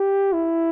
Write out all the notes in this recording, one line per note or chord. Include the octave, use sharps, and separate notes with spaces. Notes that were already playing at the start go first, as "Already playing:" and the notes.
Already playing: G4
E4